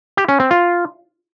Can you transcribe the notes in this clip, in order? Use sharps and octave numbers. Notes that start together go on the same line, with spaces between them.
G4
C#4
C4
F4